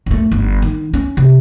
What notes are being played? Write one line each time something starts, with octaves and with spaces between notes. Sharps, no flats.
F#2 A3
G1
D#3
C#4
C3